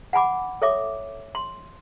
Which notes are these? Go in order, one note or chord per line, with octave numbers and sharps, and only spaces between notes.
F#5 G#5 B5 D6
A4 C#5 E5 D6
C6